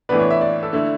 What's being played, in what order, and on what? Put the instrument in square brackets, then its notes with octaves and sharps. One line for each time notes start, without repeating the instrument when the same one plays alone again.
[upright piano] A2 E3 B3 D4 B4
C#5
E5
D5
A4
D3 A3 E4